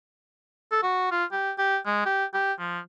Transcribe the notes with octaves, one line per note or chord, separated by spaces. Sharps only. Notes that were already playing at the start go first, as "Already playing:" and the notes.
A4
F#4
F4
G4
G4
G#3
G4
G4
F3